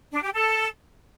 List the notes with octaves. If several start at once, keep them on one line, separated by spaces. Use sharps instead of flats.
D4
G4
A4